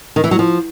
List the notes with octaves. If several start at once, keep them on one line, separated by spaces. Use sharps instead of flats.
D#3
E3
F#3
F3